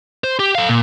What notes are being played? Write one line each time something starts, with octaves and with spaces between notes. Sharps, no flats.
C5
G4
A4 F5
A#2